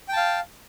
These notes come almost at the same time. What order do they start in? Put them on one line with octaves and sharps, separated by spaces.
G5 A5 F5